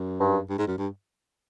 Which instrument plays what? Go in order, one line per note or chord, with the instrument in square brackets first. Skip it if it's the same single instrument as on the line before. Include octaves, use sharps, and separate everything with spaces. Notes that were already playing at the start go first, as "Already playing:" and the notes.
Already playing: [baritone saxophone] F#2
[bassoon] G2
[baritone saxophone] G2
G#2
F#2
G2